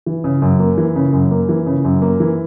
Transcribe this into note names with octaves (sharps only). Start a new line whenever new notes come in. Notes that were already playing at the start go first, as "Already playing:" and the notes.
E3
C#3
F#2
A#3
E3
C#3
F#2
A#3
E3
C#3
F#2
A#3
E3